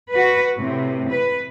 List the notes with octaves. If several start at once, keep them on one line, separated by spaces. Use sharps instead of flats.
F#4 B4
A2 C3
B4